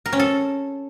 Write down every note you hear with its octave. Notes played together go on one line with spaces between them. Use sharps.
A#4
C#4
A4